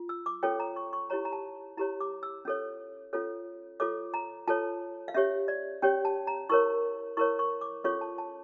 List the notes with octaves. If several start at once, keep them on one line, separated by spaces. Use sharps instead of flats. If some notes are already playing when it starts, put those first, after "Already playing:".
Already playing: F4
E6
D6
C#4 F4 A4 C#5 G5
A#5
C#6
C#6
E4 G4 C#5 A#5
A#5
A5
E4 G4 C#5 A#5
D6
E6
C#4 F4 A4 C#5
C#4 F4 A4 C#5
F4 A4 C#5 D6
A#5
F4 A4 C#5 A5
F5
C#4 G4 C#5 E5
D5
C#4 G4 C#5 G5
A5
A#5
E4 A#4 C#5 C#6
E4 A#4 C#5 C#6
C#6
D6
C#4 F4 A4 C#5 C#6
A5
A5